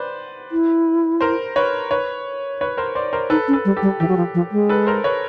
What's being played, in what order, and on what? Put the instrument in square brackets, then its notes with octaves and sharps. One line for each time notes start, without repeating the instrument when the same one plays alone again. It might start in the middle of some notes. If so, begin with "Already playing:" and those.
Already playing: [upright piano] B4 C5 D5
[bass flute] E4
[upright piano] A#4 C5
B4 C#5
B4 C#5
B4 C#5
A#4 C5
C5 D5
A#4 C5
[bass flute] D#4 [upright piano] A4 B4
[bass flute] C#4
[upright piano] A4 B4
[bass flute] G3
[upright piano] G4 A4
[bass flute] G3
[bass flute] E3 [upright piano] G4 A4
[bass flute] F#3
F3
F3
G#3
[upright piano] A4 B4
A#4 C5
B4 C#5